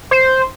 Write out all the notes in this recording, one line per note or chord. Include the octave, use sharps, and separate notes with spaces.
C5